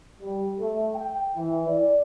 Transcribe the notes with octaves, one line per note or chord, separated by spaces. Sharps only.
G3
A3
G5
E3
D5